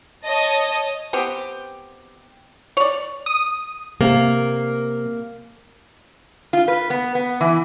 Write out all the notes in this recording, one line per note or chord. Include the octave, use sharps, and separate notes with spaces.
C#5 D#5 A5
B3 C4 G4
C#5 D5
D#6
C3 A#3
F4
B4
B3
B3
E3